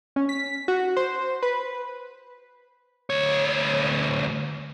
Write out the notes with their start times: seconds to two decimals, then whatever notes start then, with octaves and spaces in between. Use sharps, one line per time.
0.16 C#4
0.29 B6
0.68 F#4
0.97 C5
1.43 B4
3.10 D2 C#5